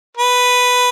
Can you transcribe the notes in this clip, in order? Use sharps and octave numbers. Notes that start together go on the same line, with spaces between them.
B4